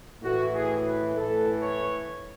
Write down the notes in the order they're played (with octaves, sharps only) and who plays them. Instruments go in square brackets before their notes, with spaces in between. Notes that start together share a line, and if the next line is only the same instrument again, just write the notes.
[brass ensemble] A2 E3 F#4
G#4
B4
A2 E3 A4
C#5